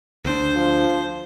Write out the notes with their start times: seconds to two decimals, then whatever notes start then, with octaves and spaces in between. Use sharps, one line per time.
0.25 D2 C4 D4 C5
0.57 F3